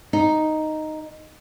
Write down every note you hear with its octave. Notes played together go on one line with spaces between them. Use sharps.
D#4